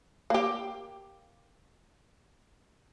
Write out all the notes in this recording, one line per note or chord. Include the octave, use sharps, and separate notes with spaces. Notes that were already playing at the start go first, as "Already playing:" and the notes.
A#3 G4